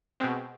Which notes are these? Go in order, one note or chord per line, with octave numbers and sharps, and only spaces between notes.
B2 G#3 C4